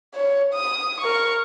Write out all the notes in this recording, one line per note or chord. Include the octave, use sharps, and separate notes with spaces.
C#5
D#6
A#4 C#6